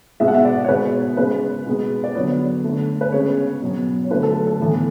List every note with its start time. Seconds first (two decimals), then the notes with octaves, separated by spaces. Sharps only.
0.20 B2 G#3 B3 E5
0.28 F#5
0.35 E5
0.45 D5
0.64 C#5
0.68 B2 G#3 B3 B4
1.17 C#3 G#3 B3 B4
1.66 B2 G#3 B3
2.04 D5
2.15 D3 F#3 B3 C#5
2.64 D3 A3
3.01 B4
3.12 C#3 G#3 B3 C#5
3.62 B2 F#3 B3
4.04 C#5
4.10 D3 F#3 A3 B4
4.23 A4
4.34 A4
4.47 A4
4.60 A2 E3 B3